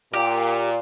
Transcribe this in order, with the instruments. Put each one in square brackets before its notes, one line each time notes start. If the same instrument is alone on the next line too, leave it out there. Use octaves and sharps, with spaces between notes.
[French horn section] A#2 [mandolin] G4